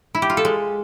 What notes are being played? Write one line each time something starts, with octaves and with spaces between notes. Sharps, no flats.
E4
G4
F4
A4
G#3